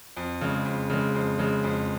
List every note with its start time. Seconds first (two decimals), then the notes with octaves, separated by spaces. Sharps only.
0.17 F2
0.41 C#3 G#3
0.65 F2
0.90 C#3 G#3
1.15 F2
1.39 C#3 G#3
1.64 F2